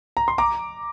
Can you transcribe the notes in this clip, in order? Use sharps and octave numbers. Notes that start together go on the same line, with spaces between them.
A#5
C6
A#5 D6